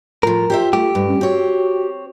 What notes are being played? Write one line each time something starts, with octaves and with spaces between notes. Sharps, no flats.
A2 F3 F4 A#4
F4 G4 C5 E5
A3 G4
G2
C#4
C4 F#4 C#5